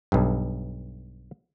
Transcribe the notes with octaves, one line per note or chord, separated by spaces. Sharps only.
B1 G2